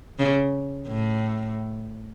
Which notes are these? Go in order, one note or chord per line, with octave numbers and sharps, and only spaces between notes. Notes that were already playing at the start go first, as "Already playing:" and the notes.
C#3
A2